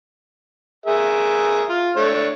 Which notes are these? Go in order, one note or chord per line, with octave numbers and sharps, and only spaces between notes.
G#4 A#4 E5
F4
A3 D4 C#5